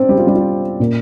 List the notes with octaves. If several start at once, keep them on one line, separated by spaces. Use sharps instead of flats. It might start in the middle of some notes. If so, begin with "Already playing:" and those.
Already playing: C4 D4 C5 D5
G3 G4
F4
G3 G4
F4
A#2 A#3